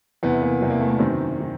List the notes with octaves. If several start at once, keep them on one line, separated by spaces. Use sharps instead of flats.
E2 C3 E3 B3
A#3
E2 C3 E3
A#3
A3
A#3
F#2 D#3 C4
D#3